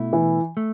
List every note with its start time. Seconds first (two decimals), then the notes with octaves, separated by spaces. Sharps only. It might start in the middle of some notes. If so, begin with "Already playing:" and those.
Already playing: B2 A3 E4
0.13 E3
0.57 A3